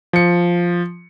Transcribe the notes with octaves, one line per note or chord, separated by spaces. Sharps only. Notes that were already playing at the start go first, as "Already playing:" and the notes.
F3 C#7